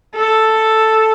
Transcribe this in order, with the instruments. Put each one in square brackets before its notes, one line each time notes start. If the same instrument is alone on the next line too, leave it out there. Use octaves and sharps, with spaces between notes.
[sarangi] A4